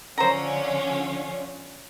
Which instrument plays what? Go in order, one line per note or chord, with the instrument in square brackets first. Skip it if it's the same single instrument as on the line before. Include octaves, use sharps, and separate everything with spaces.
[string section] D3 F3 C#4 [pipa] C5 A#5